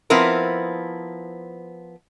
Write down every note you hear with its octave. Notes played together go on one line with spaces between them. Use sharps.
F3 B3 C4 E4 A#4